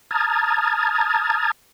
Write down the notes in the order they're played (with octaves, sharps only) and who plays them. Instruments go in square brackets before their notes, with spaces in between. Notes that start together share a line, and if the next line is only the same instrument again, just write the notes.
[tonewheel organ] A5 A#5 D#6 F6 G#6 A6